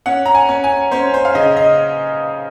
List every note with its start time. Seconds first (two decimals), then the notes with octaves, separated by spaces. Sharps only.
0.06 C#4 F#5
0.26 A#5
0.35 G#5
0.49 C#4
0.64 G#5
0.91 C#4 C5
1.14 C5
1.25 F5
1.35 C#3 D#5
1.57 D#5